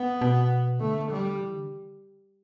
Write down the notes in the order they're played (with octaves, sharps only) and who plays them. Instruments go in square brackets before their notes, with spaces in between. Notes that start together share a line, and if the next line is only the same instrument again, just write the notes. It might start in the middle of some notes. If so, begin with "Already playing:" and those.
Already playing: [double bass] B3
[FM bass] B2
[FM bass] D3 [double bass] A3
[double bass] G3
[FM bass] E3
D3